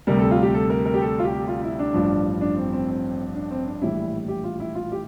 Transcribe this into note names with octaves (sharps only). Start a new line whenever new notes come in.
D2 C3 G3 A#4
A4
F4
G4
A4
A#4
A#4
G4
A4
F4
G4
F4
E4
D4
A1 G2 F3
D4
C4
C4
C4
D4
C4
D4
A#1 A2 E3 G3 E4
G4
F4
E4
F4
G4